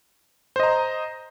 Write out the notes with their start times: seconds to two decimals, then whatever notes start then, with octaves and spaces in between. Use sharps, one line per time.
0.56 C5
0.60 D#5
0.63 A#5